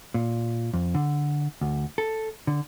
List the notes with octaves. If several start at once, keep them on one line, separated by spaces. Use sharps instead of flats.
A#2
F2
D3
D2
A4
D3